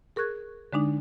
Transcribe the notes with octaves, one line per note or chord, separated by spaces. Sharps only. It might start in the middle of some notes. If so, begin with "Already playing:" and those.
G#4 A#4 C#6 F#6 G#6
D3 G#3 D4 D#4